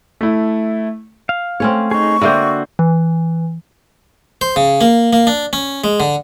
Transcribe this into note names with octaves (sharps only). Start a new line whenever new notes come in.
A3 E4
F5
A3 C4 C#4 C#5
D#4 G#4 C#6
D3 A#3 C4 F#4 E5 E6 G6
E3
C5
C#3
A#3
A#3
D4
C#4
G#3
D3